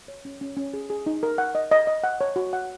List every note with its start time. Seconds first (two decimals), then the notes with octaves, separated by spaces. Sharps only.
0.08 C#5
0.25 C#4
0.41 C#4
0.57 C#4
0.73 G#4
0.90 G#4
1.06 D#4
1.23 A#4
1.38 F#5
1.55 D#5
1.72 D#5
1.87 D#5
2.04 F#5
2.21 C#5
2.36 F#4
2.53 F#5